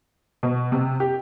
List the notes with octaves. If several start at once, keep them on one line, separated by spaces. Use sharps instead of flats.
B2
C3
G4